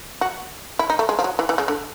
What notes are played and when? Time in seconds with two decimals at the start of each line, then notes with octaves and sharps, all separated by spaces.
0.21 F#4
0.79 E4
0.90 D#4
0.99 A3
1.09 G#3
1.19 F3
1.24 F#3
1.39 E3
1.49 E3
1.58 C#3
1.68 D3